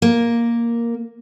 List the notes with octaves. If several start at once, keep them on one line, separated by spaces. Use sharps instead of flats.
A#3